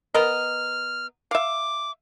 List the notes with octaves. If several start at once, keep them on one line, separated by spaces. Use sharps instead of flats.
B3 A#4 D#5 F6
E5 F5 D6